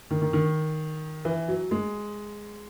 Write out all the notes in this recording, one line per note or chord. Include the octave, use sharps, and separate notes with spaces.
D#3
D#3
D#3
E3
F#3
G#3